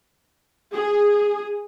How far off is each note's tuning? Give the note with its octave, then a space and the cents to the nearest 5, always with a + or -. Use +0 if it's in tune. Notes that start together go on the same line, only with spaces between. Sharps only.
G#4 -10